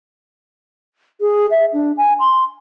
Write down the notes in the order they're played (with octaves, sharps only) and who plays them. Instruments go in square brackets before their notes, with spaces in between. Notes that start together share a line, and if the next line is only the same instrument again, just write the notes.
[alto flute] G#4
E5
D4
G#5
C6